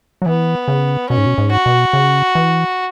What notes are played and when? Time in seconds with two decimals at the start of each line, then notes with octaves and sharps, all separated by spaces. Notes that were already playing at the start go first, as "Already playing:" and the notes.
0.22 F#3
0.26 E3 B3
0.68 C#3
1.10 B2 C#4
1.18 G#2
1.26 B2
1.38 G#2
1.52 F#4
1.66 B2
1.93 C#3
2.35 E3